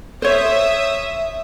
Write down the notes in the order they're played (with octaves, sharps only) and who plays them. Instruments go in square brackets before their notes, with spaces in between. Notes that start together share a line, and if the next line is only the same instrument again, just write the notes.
[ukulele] C5 C#5 [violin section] E5 D#6